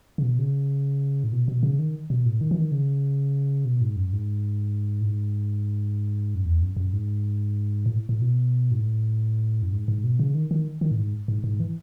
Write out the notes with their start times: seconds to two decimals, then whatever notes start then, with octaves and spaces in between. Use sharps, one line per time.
0.18 C#3
0.23 B2
0.39 C#3
1.24 A2
1.32 B2
1.48 B2
1.63 C#3
1.79 D#3
2.10 B2
2.26 A2
2.41 D#3
2.51 E3
2.57 D#3
2.72 C#3
3.65 B2
3.81 G#2
3.96 F#2
4.13 G#2
5.01 A2
5.05 G#2
6.35 F#2
6.45 E2
6.62 F#2
6.77 F#2
6.93 G#2
7.86 A2
8.09 A2
8.21 B2
8.71 G#2
8.79 A2
9.62 F#2
9.73 G#2
9.88 G#2
10.04 B2
10.19 C#3
10.35 D#3
10.51 D#3
10.81 D#3
10.91 A2
10.97 G#2
11.28 G#2
11.44 G#2
11.60 E3